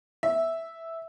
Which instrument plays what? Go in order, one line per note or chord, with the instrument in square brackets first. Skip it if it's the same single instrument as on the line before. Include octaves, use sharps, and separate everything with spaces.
[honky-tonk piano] E5